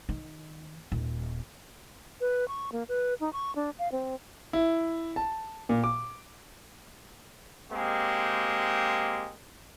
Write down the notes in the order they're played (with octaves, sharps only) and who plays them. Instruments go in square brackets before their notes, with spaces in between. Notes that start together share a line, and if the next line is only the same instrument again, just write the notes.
[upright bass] D#3
D#1
[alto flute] B4
C#6
A#3
B4
D#4
C#6
D4
F5
C4
[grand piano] E4
A5
A#2
D6
[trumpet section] G#3 A#3 C4 G4